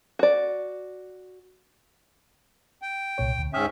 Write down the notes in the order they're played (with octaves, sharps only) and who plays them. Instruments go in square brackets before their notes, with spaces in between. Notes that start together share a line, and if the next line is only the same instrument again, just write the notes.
[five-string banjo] F#4 D5
[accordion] G5
[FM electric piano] C2 A#2 C#5
D2
[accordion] G#2 C#4 E5 [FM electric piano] G5 D#6 F6